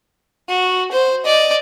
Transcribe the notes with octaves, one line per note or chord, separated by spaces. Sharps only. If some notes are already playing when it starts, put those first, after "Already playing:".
F#4
C5
D5 D#5